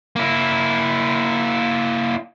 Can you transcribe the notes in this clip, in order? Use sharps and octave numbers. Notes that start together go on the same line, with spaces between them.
A#3 E4